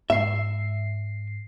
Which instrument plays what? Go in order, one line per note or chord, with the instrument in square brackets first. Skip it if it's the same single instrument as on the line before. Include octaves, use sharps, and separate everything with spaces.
[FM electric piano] G#2 C7 [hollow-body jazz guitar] E5